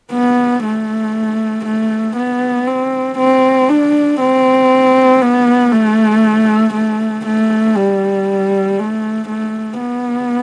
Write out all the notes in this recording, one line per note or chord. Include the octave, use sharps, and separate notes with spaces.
B3
A3
A3
B3
C4
C4
D4
C4
B3
A3
A3
A3
G3
A3
A3
B3